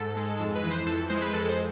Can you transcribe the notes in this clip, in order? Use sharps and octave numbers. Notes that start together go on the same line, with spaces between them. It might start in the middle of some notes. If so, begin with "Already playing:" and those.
Already playing: G#2 A4
G#3
F2
B4
E3
C5
F2 A4
G#3 C5
B4
F2 A4
C5